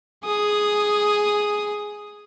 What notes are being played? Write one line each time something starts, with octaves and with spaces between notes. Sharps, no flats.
G#4 D#6